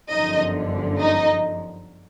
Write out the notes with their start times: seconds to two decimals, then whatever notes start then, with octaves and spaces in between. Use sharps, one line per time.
0.10 G1 F#2 D3 F3 D#4 D#5
0.99 D#4 D#5